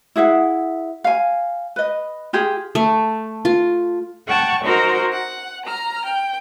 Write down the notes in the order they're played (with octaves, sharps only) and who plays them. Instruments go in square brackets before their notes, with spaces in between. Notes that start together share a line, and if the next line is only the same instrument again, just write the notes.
[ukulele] E4 G#4 E5 F#5
F5 G#5
B4 D#5
F4 G4 G#4 G5
[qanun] A3
F4
[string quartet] F#5 G5 A5 C#6
D#4 F#4 A#4 C5 A#5
F#5
A#5 F6
G5